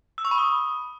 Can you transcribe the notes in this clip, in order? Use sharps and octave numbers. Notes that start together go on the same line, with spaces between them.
E6
C#6
B5
D#6